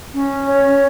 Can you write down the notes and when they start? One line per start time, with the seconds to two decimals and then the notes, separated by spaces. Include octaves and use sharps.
0.13 C#4
0.48 C#5